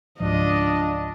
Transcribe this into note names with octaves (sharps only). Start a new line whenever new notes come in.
C#2 G#2 F3 D4 F4 D#5